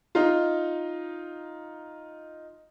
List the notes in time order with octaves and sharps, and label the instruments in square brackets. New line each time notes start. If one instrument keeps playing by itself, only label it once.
[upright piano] D#4 F4